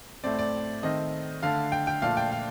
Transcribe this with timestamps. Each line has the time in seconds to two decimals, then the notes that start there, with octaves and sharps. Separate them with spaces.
0.24 A2 A3 C4 D5
0.39 D5
0.83 D#3 A3 C4 D#5
1.43 D3 A3 D4 F5
1.72 G5
1.87 G5
2.02 A#2 F3 A3 D4 F5
2.17 G5
2.32 F5